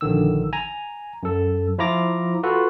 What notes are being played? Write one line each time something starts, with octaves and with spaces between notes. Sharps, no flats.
A#1 D3 D#3 E6
G#5 A#5
F#2 A4
F3 E4 F4 A#5 D6 A#6
F4 F#4 A4 B4